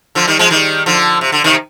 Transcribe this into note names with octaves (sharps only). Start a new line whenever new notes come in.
D3 F3
D#3 G3
F3 G#3
D#3 G3
D3 F3
C3
D3
C3 D#3